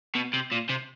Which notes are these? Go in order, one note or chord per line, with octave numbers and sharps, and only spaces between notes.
B2
C3
A#2
C3